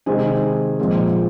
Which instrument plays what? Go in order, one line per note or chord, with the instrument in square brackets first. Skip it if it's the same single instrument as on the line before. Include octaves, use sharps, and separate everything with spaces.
[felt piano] C3 D#3 G#3 C4 G#4 G#5
A#2 F3 G#3 C4